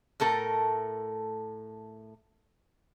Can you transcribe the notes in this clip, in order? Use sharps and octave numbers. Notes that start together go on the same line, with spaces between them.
A2 A3 A4 A#4